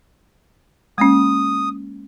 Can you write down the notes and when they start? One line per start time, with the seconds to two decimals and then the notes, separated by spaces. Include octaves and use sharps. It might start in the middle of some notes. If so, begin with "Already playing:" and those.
0.98 G#3 A#3 C#4 D#6